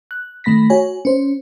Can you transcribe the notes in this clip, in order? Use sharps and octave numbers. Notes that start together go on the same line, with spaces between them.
F#6
D#3 A3 B5 A#6 B6
F#4 C#5 G#5
C#4 C5